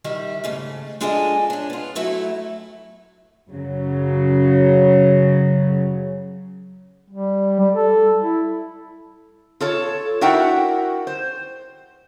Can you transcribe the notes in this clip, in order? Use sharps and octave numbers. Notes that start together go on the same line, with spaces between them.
D#3 G3 E5
G#2 C#3 A3
G#3 D4 F4 G#4 A4 D#5
C#4 D4
B3 F4
F#3 A3 E4 F#4
F#2 C#3 F#3
G3
G3
A4
E4
F4 A4 C#5
D4 E4 F#4 A#4 F#5 G5
C5